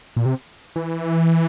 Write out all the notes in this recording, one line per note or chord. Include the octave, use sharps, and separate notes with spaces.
A#2
C3
E3